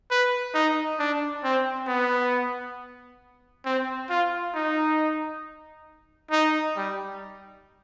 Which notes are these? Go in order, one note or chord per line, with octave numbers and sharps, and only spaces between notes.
B4
D#4
D4
C4
B3
C4
F4
D#4
D#4
G3